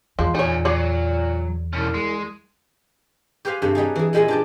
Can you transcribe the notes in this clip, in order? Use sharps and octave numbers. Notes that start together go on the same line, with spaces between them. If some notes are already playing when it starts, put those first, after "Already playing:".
E2 F3 G#3
A#2 D#4 C#5 F#5 G#5
F#3 C#5 D5
C2 B2 C#4
G#3
G4 B4 C5 F5 G#5
G2 C3 A3
F#3 G3 D#4 G#4
E3 G#4
A#2 G3 G#3 E4 G#4 G#5
D4 G4 A5